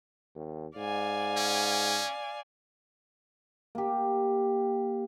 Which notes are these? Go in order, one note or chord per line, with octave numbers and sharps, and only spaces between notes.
D#2
G#2 D5 F5 G#5
C#4
A#3 G4